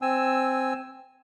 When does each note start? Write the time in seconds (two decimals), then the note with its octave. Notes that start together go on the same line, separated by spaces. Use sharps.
0.02 C4 G#5 E6